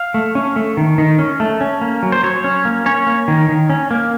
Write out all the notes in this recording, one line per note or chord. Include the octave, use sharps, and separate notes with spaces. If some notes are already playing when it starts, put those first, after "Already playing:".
Already playing: F5
A3
C#4
A3
D#3
D#3
C#4
A3
C#4
A#3
F#3
C5
F#3 C#5
C#4
A#3
C#4 C#5
A#3
D#3
D#3
C#4
A#3